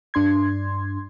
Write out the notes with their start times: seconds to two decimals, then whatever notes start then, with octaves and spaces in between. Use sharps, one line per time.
0.14 G2 D4 C6 G#6